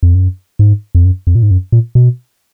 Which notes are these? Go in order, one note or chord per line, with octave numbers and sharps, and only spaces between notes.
F2
F#2
G#2
F2
F#2
F2
A#2
G#2
F#2
A#2
B2